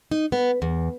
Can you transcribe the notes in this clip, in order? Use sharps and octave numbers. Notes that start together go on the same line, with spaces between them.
D#4
B3
E2